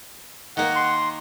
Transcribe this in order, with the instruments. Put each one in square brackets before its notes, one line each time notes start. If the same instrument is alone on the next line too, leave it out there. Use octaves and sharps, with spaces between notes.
[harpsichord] D#3 A#3 [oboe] F#5
[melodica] C6